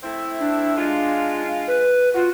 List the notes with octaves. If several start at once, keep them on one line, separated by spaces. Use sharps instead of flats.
A3 C4 E4
D4
G#3 F4
B4
F4 F#4